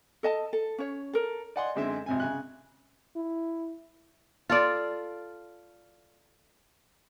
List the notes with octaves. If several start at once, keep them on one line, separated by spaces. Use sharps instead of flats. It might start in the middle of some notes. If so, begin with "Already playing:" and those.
A4 D#5 A5
A4
C#4 C#5
A4 A#4
D5 D#5 F#5 G#5 C6
F#2 D3 G#3 C4 E5
G#1 C3 G#5
C#3 G#5 F#6
E4
F4 A4 D5